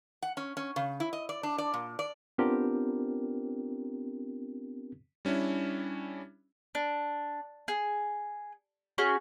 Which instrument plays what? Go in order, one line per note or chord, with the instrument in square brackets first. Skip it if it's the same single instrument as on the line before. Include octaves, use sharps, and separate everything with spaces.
[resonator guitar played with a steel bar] F#5
C#4
C#4
C#3
E4
D#5
D5
D4
D5
A#2
D5
[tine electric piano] B3 C4 D4 F4 G4 A#4
[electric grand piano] G3 C#4 D4 E4
[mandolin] D4
G#4
C#4 F#4 G#4